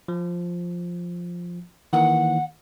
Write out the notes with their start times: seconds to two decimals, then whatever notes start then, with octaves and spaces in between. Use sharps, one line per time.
0.08 F3
1.93 D#3 E3 A#3 F#5